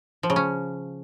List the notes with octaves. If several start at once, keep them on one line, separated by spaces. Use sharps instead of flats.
F3
C#3
C#4